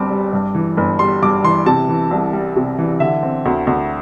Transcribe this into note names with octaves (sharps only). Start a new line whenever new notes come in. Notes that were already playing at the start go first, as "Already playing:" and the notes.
Already playing: G1 G2 C4 D6
G3
G2
E3
G1
G3 C6
G2 D6
E3 C6
C3 A5
E3
C2
G3
C3
E3
D3 E5
C4
D2
D2